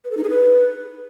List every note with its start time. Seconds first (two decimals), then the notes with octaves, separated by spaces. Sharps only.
0.05 B4
0.11 A4
0.17 D#4
0.23 G#4
0.30 B4